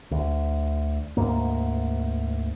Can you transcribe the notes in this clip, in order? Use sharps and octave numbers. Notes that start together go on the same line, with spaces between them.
D2
D2 G#2 A#3